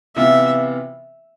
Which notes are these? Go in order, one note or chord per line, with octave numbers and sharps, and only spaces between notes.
C3 E3 B3 F4 E5